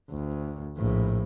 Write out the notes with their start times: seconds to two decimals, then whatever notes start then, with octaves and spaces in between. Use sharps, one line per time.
0.11 D2
0.77 A#1 A2